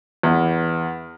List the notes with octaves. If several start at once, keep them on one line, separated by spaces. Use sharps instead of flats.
E2